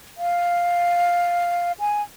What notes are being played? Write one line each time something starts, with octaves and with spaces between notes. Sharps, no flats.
F5
G#5